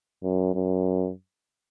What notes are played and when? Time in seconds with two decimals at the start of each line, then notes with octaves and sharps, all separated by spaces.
0.23 F#2
0.54 F#2